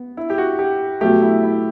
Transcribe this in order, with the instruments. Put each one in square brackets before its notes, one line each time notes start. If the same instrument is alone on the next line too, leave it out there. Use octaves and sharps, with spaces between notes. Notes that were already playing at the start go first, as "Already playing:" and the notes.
Already playing: [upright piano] B3
[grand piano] E4
G4
F#4
G4
[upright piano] B2 F#3 A3 [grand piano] G4
[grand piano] E4
E4